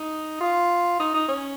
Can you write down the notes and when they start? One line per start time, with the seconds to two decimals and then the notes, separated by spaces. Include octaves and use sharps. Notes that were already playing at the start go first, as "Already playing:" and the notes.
Already playing: D#4
0.40 F4
1.00 D#4
1.14 D#4
1.29 C#4